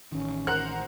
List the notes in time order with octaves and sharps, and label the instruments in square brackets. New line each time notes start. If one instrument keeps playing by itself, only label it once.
[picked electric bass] A1 D#3 [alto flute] C#4
[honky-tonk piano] A#4 C5 F#5 [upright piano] F#6